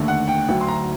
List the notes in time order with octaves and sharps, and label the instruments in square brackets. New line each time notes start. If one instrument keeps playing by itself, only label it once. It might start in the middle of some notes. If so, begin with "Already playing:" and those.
Already playing: [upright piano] D#2 D3 A3
F#5
G5
D2 D3 F#3 G5
C6
A#5